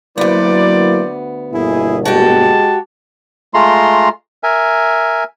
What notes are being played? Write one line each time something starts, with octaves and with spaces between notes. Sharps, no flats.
D2 F#3 A#3 B3 E4 B4 C5 D5
G1 B2 A#3 E4 G#4
G#3 F#4 G4 A5
G#3 A3 F4 A#5 C6
A#4 E5 G#5